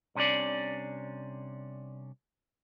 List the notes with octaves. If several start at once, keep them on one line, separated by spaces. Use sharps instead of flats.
C2 C3 C#4 D4 D5